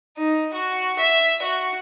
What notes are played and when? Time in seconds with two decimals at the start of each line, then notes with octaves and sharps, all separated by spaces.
0.17 D#4
0.54 F#4
0.99 E5
1.43 F#4